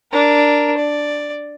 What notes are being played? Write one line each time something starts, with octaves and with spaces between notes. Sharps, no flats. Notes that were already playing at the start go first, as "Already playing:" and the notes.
D4 A#4
D5